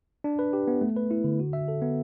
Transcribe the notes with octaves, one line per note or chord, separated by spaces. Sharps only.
D4
B4
G4
B3
A3
B4
E4
D3
F#4
E5
A4
B3